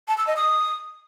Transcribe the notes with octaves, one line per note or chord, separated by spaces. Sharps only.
A5
E6
D#5
D#6